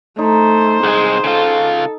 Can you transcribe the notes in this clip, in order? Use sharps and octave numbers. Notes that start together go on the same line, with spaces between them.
A3 D#4 C5
C2 G#3 G#4
C#3 F4 A4